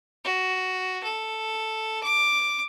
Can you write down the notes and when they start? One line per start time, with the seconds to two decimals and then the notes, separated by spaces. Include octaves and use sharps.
0.25 F#4
1.04 A4
2.04 D6